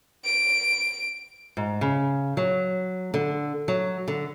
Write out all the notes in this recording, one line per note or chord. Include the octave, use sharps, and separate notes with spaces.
D7
G#2
C#3
F#3
D3
F#3
D3